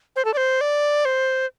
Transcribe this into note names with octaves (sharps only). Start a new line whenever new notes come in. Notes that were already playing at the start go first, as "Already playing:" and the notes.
C5
A4
D5
C5
D5
C5